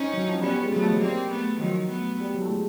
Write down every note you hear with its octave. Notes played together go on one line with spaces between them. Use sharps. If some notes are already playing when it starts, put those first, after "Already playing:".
Already playing: C4 C#4 D#4
F#3
F3
G3 B3 C#4
G3
G#3
F#3 A3 B3
F3
F#3
G3 A#3 C4
A3 B3
D#3 F3 F#3
A3 B3
G3
F#3
A3
G#3